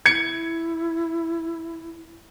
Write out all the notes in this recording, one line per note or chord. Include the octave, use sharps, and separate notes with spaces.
E4 G#6 C#7